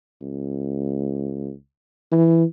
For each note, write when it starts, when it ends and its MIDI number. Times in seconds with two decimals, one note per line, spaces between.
0.21 1.52 37
2.12 2.44 52